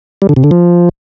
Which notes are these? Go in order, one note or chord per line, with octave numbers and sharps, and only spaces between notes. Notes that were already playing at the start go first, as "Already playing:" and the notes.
G3
D3
C3
D3
F3